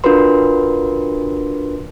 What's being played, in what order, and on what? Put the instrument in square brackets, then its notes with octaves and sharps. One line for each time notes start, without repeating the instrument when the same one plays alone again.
[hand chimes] D4 F4 F#4 A#4 B4 C6